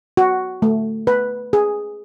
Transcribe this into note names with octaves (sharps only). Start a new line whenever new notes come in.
F#4
A3
B4
G#4